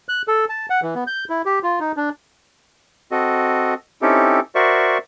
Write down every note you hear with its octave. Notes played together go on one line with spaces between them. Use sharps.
F#6
A4
A5
F#5
E3
B3
G6
E4
G4
F4
D#4
D4
C4 F#4 A4 D#5
C4 C#4 D#4 E4 G4 A4
F#4 A#4 C5 D5 E5 C#6